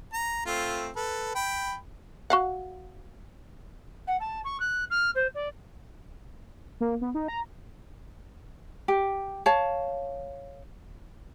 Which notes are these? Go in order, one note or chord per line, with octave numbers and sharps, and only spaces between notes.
A#5
A3 C4 F4
A4 B4
G5 B5
F#4 F5 F#5
F#5
A5
C#6
F#6
F6
C5
D5
A#3
B3
D#4
A#5
G4
C#5 F5 A5